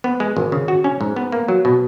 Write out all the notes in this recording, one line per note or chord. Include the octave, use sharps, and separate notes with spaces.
B3
G#3
G#1
C#3
F#4
C#4
G#2
B3
A#3
F#3
B2